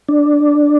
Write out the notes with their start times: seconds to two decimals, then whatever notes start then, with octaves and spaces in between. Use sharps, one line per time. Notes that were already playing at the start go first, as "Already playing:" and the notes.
0.08 D4